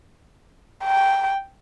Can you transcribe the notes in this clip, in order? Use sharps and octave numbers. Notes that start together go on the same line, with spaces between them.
G5